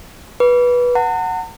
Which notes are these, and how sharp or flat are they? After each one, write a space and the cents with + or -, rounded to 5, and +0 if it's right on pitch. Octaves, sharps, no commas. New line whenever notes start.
B4 -15 D6 -40
F#5 +0 A#5 -45